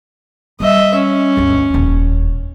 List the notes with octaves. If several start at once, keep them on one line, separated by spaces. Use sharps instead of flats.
G3 D#5 E5
C#4
G1 D2
D#1 F2